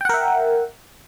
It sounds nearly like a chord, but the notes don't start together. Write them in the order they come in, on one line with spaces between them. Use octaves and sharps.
G5 F#5 A#4 E5